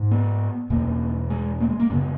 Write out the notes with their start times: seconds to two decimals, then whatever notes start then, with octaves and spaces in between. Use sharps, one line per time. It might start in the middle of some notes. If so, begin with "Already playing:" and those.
Already playing: G#2
0.11 B3
0.70 E2 B2 A#3
1.30 G#3
1.60 A#3
1.69 G#3
1.80 A#3
1.90 F#2 C#3 B3